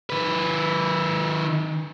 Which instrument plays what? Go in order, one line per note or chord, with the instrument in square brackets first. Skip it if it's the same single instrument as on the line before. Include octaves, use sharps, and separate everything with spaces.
[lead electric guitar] D#3 B4